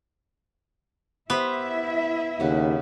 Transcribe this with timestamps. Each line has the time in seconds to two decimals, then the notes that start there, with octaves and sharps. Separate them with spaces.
1.30 B3 E4 G4 C5 E5
2.40 D#2 C#3 G4 F#5